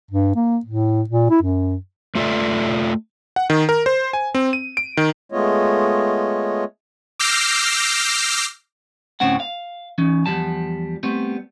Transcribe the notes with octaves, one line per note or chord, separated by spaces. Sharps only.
G2
A#3
A2
A#2
E4
F#2
A3 F4 A4 D5 E5
F#5
D#3
A#4
C5
G#5
C4
D#7
D7
D#3
G#3 A3 B3 F4 C#5 D#5
D6 E6 F6 G6 A#6 C7
D2 A2 C4 C#4 F#5
F5
E3 C#4 D#4
E2 D#3 F3 G3 A5
G3 A3 B3 C4